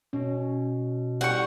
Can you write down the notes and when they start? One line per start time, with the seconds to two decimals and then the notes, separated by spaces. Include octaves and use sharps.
0.13 B2 C#4
1.21 A2 G3 F#5 C#6